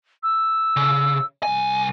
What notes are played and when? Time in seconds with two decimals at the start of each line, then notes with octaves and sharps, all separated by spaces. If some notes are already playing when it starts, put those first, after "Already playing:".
0.23 E6
0.77 C#3
1.43 C2 G#5